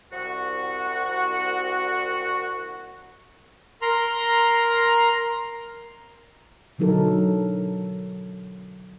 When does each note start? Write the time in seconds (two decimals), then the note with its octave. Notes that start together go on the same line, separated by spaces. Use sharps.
0.12 C2 F#4
3.82 A#4 A#5 C6
6.78 B2 D3 F#3 D#4 A4 A#4